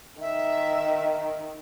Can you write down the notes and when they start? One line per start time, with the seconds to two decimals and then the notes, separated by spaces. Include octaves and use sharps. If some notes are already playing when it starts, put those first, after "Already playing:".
0.21 D#3 E5